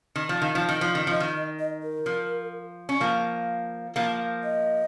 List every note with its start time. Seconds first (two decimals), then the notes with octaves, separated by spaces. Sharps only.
0.16 D#3
0.29 F3
0.40 D#3 F5
0.55 F3
0.69 D#3
0.81 F3
0.95 D#3
1.07 F3 D#5
1.20 D#3
1.35 D#5
1.59 D#5
1.83 A#4
2.06 F3
2.89 C#4
3.00 F3 A#3
3.96 F3 A#3 F5
4.43 D#5